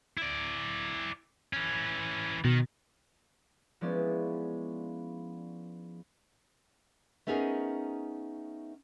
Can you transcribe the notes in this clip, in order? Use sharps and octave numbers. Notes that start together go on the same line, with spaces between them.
E4 D5
E3 C#4
B2 D#3
F3 G#3 B3 C#4 E4 D5
A3 B3 C#4 D#4 G#4 A#4